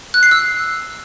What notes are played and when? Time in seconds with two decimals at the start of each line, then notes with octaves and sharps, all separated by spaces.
0.14 F#6
0.23 C7
0.31 E6